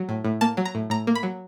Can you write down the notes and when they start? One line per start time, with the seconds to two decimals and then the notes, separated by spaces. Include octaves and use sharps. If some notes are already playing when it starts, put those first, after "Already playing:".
Already playing: F#3
0.09 A2
0.25 A2
0.41 A#3 A5
0.57 F#3
0.65 A#5
0.75 A2
0.90 A2 A#5
1.07 A#3
1.15 B5
1.23 F#3